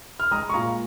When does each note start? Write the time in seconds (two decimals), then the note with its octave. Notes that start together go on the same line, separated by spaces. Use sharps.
0.20 F6
0.31 G#3 A#5 D#6
0.49 C#6
0.54 A#2 F5 A#5